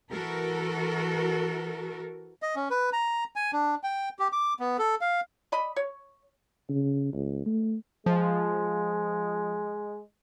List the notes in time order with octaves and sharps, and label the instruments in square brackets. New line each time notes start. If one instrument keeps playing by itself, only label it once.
[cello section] E3 F#4 A4 A#4
[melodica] D#5
C#4
B4
A#5
G#5
D4
G5
G4
D6
B3
A4
F5
[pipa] D5 D#5 B5
C#5
[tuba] C#3
C#2
A3
[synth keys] F3 [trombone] G#3